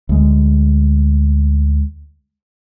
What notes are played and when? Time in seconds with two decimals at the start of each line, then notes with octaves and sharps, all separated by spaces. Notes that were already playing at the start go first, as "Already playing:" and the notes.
0.09 D2 G#3